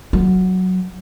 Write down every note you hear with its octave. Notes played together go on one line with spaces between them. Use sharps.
F#3